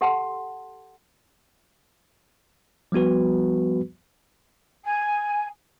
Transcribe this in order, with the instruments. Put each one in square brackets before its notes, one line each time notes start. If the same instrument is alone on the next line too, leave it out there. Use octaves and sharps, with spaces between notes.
[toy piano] G4 A4 F#5 A5 C6
[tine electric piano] F3 G3 B3 F#4 B4
[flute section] G#5